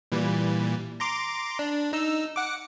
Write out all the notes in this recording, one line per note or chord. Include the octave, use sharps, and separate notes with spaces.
A#2 E3 G3
A#5 C6 D6
D4
D#4 E6
F#5 D6